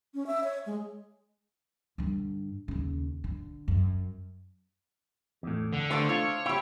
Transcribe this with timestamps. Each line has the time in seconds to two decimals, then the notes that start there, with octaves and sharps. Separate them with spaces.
0.14 C#4
0.27 E5
0.44 C#5
0.66 G#3
1.98 G2 D3
2.68 D#2 C#3
3.24 D3
3.68 F#2
5.43 E2 A2
5.73 D3
5.91 A3 D4 C5 D5 F5
6.09 F4 C#5
6.46 E4 G4 G5